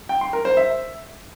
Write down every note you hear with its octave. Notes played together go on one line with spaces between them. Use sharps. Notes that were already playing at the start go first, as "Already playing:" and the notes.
G5
C6
A#4
C5
E5